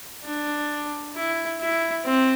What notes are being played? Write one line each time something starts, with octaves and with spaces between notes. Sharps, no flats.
D4
E4
E4
C4